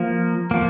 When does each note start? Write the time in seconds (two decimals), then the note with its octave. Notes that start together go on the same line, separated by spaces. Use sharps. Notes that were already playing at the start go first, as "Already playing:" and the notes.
Already playing: F3 A#3
0.51 F3 A#3